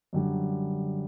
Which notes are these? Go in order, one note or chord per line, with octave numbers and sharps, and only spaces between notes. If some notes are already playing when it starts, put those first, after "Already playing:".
F#2 D3 G3